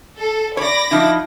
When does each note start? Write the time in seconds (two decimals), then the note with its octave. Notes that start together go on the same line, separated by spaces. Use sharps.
0.18 A4
0.57 C#5 D5 B5 D6 A#6
0.91 F3 D#4 E4